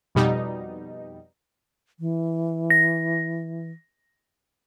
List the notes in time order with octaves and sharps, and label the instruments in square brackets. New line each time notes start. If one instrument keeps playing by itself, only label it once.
[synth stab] F2 B2 G3 D#4
[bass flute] E3
[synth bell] A#6